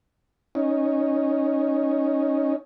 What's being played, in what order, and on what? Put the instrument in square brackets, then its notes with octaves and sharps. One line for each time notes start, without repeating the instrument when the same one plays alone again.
[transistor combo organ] C#4 D#4